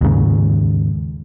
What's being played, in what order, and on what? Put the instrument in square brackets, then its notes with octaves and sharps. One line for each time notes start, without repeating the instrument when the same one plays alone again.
[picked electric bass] D#2 G#2 C#3